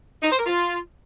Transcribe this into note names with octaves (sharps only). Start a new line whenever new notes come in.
D#4
C5
A#4
F4